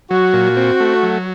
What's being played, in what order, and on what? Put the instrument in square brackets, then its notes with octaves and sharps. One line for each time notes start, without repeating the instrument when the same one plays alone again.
[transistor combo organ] F#3 [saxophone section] F#4
[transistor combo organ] A#2
C4
A3
F#3